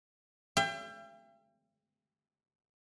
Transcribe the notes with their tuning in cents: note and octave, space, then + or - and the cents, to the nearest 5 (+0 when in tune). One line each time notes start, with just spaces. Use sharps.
E5 +45 G5 +25